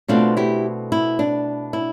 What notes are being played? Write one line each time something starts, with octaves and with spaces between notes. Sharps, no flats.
B2 A3 C4 D4 F4
E4 G4
E4
D4
E4